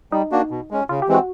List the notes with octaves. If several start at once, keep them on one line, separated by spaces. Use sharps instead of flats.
G3 D#4
A#3 D4 F#4
B2
G#3 C#4
C#3 F4
G4
E3 G#3 C4
F#4